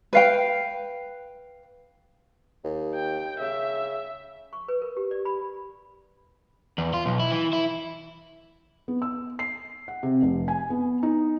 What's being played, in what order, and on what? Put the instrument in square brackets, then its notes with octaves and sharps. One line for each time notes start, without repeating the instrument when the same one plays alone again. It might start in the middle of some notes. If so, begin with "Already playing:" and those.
[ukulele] B4 F5 G5
[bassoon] D#2
[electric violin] G5
[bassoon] C#3 [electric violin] E5
[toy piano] C#6
B4
A#4
G4
D5
B5
[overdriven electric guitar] E2
F4
B1
E4
E3
E4
[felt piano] B3
E6
C7
F#5
C3
F1
G#5
B3
D#4